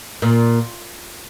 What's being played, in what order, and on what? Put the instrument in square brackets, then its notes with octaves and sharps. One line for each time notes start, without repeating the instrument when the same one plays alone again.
[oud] A#2